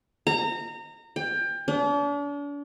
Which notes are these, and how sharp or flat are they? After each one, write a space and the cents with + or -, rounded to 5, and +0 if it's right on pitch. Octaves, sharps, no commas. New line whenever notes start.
A#5 -25
G5 +25
D4 -40